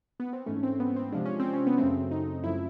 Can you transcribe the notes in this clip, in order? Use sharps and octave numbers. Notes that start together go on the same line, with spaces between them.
B3
C4
G#2 E3 A3 C#4
C4
B3
C4
C3 F3 G#3 D4
C#4
C4
C#4
B3
F#2 C#3 F#3 A3 C4
D#4
F#2 C#3 F3 A3 E4